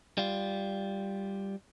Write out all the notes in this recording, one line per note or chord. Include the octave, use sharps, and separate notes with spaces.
G3 F4